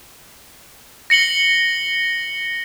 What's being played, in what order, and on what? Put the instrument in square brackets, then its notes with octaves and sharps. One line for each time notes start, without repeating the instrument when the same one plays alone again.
[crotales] A#6 C#7 F#7 G7